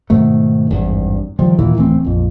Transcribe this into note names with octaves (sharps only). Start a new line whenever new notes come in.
G#2 B2 D#3 A3
G#1 E2 G2
D#3 F3 G3
D#2 A#2 D#3 E3
D1 E3 A3 C4
A#1 F2